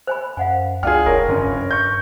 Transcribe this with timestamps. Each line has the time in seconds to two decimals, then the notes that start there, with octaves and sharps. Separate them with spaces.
0.07 C5 G#5 B5
0.37 F#2 F5 F#5 G#5
0.83 C#2 D4 F4 G#4 G5 F6
1.06 F1 A#4 C#5
1.29 F#1 G2 C#4
1.71 C#6 G6